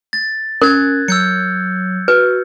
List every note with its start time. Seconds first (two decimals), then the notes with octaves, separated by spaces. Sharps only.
0.13 A6
0.62 C#4 A#4 F#6 G#6
1.08 F#3 E6 G6 C#7
2.08 F#4 B4